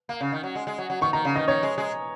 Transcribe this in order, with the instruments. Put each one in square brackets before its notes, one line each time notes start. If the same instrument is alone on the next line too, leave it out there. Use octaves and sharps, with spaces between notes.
[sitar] A#3
C#3
D#3
F#3
G#3
G#3
F#3
F#3
[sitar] D#3 [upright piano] C#6
[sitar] D#3 [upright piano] A#5
[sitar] C#3
[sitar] D#3 [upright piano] D#5
[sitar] D#3 [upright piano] C#5
[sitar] G#3
G#3